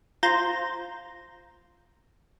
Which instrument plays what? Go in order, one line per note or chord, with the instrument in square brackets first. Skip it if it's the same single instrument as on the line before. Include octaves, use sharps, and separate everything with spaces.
[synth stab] F4 C5 A#5 G6